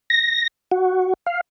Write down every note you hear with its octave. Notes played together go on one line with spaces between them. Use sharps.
A#6
F#4
F5